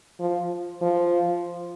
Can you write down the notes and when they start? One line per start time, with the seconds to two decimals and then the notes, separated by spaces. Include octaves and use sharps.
0.20 F3
0.82 F3